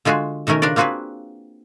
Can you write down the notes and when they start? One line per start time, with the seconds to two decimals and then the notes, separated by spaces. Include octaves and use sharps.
0.05 D3 G#3 F4 F#4 G#4
0.47 B2 D#3 A3 C#4 A#4
0.62 C#3 D4 F4 A#4 D5
0.76 A#3 C4 F4 F#4 G#4 B4